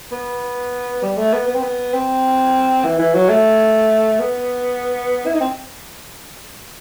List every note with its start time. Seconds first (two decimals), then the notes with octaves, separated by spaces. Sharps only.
0.12 B3
1.03 G3
1.17 A3
1.33 B3
1.47 B3
1.55 C4
1.63 B3
1.94 C4
2.84 E3
2.99 E3
3.14 F#3
3.29 A3
4.20 B3
5.26 E4
5.34 D#4
5.41 C4